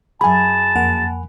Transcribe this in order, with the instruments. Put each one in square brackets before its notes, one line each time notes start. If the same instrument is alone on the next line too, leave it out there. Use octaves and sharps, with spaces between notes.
[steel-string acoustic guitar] F#2 G#4 [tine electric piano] G#5 B5 [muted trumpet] A5
[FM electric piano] F2 A#3 F#5